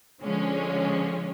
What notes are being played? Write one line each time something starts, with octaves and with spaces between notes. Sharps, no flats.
D3 F3 G#3 C#4